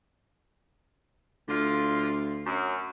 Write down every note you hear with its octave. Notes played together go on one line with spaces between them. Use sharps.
D2 D3 F4
F#2